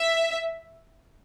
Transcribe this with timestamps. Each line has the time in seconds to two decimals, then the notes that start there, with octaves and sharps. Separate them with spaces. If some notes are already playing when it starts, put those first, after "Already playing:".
Already playing: E5